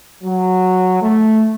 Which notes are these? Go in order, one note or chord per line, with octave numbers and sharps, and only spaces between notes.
F#3
A3